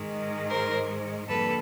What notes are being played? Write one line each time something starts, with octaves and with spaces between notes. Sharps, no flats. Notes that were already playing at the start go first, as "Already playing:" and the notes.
Already playing: G#2 D#3 G#3
A#4 C5
F2 D3 G3 A#3 A4 B4